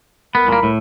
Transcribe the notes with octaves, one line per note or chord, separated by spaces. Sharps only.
C2 B3 A#4 B5
A#2 A#3
A2